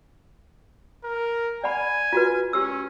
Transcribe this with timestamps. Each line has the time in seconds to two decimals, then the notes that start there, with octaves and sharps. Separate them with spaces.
1.03 A#4
1.64 D5 F#5 G#5 B5
2.13 F4 F#4 B4
2.53 C#4 G4 E6